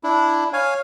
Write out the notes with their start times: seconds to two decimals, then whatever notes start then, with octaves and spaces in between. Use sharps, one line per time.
0.04 D4 E4
0.53 C#5 F5 G#5